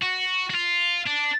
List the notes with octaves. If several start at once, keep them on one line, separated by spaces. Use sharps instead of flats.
F#4
F#4
F4
D4